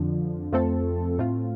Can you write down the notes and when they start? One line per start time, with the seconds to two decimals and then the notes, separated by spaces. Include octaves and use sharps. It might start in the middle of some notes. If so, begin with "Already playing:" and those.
Already playing: F2 D3 F3
0.52 F2 F3 A3 C4 A4
1.18 A2 A3 C4 F4